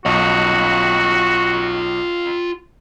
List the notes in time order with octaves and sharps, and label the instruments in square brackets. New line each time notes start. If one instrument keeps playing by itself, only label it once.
[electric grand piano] B1 [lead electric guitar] F4 D#5 [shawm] F#4